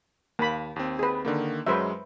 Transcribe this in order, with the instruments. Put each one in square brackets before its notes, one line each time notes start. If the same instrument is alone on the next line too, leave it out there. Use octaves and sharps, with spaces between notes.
[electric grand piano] D#2 [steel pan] A#3 B5
[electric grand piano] D#2 C4
[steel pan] G#4 B4
[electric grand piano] D3 D#3 A#3
[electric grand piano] F#2 F#3 G#3 [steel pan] B4 C5 E5